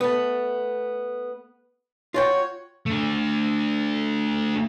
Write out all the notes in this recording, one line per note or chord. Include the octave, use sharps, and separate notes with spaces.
A3 B3
F4 F#4 C#5 G5
A3 D4